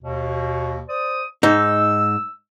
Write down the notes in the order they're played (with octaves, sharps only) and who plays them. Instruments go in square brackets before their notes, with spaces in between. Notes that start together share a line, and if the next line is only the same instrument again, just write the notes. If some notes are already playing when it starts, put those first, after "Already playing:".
[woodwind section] D#2 B2
C5 D5 D#6
[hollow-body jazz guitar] G#2 D#4 [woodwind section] E6